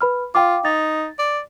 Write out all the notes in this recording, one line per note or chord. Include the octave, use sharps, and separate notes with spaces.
B4 B5 F6
F4 F5 G5 D6
D#4 A6
D5